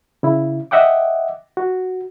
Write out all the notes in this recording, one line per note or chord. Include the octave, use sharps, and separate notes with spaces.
C#3 E4
D#5 E5 F#5 G5 D6
F#4